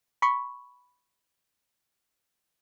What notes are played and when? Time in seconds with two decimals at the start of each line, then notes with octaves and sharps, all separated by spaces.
0.22 B5 C#6